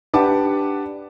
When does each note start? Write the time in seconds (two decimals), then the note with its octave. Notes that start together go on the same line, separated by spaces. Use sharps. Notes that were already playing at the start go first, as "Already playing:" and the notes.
0.14 D4 G4 B4 F#5 A5 D6